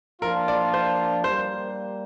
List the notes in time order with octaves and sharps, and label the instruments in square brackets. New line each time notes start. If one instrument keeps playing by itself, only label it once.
[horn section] F3 A#3 D4 F4 [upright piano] A#4
[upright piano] D5
C5
[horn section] G3 A#3 [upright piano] C5